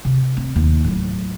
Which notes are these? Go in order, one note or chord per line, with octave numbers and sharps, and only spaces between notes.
C3
C4
D#2
A2 F#3